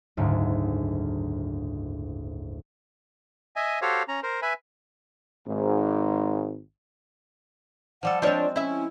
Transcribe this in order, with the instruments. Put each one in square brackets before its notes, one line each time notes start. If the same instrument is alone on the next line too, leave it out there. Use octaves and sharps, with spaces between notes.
[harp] F#1 D2 G#2 G#3
[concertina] D#5 E5 G#5
F#4 G4 A4 C5 C#5 F5
C#4 A#5
A#4 C5
B4 E5 G#5 B5
[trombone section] G#1 G#2
[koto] F3 G3 A4 [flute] F#5
[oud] F3 D4 C#5 [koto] G#3 C4 [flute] D5
[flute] C#4 [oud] E4 E5